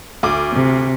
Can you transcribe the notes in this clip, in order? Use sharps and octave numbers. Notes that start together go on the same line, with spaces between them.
D2 D6
C3